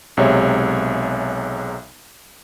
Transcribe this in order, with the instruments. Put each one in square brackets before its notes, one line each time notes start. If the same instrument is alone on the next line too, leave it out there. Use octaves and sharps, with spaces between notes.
[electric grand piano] B1 C3 G#3 C#5 E5